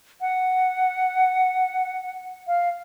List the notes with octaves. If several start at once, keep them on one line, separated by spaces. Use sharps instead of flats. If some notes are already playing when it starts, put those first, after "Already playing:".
F#5
F5